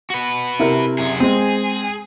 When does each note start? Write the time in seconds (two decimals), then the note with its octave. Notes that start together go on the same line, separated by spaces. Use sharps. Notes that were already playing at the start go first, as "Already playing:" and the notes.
0.10 F#4 B4
0.59 C3 E4 A#4
0.98 F#2 G#4
1.20 G#3 C4 G#4